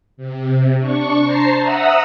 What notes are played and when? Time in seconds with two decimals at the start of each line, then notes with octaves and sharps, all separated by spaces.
0.17 C3
0.79 D4 C#6
1.23 C5 A5 A#5 C7
1.60 E5 F#5 A#5 D#6 E6